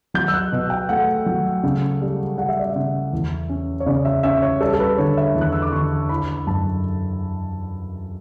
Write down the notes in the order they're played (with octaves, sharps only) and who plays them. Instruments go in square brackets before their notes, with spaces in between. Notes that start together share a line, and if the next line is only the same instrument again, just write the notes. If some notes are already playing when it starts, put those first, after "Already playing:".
[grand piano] F#3 G6
E6
F#6
B2
G5
A3 F#5
F#3
C#3
G3
G3 F#5
E5
D5
E5
C#3
E2
C#4
C#5
C#3 D5
E5
C#4 E5
C#5
G3 A4
A4
B4
D3 C#5
E5
E2
F#6
E6
D6
D3 C#6
E3 B5
B5
F#2 A5